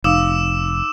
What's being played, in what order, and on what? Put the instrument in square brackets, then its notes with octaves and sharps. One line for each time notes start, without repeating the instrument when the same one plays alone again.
[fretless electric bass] F1 [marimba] D#4 F5 [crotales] D6 E6 E7